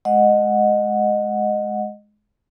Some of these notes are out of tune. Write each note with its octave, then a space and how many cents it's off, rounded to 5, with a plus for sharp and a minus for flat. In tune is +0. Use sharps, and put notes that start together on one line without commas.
G#3 +20 D#5 -15 F#5 -15